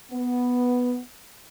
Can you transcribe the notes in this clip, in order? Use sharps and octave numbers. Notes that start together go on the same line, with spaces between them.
B3